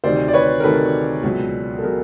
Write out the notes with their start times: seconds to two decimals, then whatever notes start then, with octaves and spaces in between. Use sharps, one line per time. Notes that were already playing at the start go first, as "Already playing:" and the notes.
0.04 D2 C3 D#3 C5 D5
0.28 D5
0.33 B4 C#5
0.60 A#4
0.63 D2 C3 D#3 A4 B4
1.23 C#2 B2 F#3
1.79 A4
1.83 B2 F#3 G#4 A#4